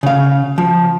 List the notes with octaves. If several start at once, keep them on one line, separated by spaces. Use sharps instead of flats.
C#3 F5
F3